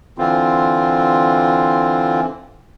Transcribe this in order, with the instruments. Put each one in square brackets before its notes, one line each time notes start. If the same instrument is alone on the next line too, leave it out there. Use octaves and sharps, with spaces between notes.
[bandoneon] D3 E3 C4 F4